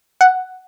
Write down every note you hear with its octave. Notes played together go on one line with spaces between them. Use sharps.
F#5